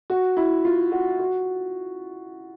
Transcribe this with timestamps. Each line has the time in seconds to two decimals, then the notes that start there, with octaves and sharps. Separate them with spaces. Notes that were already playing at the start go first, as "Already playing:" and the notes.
0.10 F#4
0.37 E4
0.65 F4
0.92 F#4
1.19 F#4